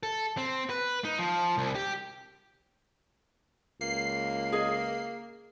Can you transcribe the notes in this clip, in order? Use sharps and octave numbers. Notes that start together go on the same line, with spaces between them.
A4
C4
B4
D#4
F3
C2
G4
C#2 A#3 C7
G#4 D#5